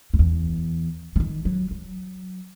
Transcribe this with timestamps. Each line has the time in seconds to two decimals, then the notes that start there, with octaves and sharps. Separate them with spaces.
0.14 F#2
0.19 E2
1.16 E3
1.20 D#3
1.45 F#3
1.71 F#3